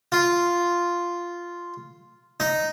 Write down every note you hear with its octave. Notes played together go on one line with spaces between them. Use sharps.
F4
D#4